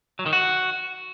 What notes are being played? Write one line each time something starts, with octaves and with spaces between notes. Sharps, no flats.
F#3
D#3
F#4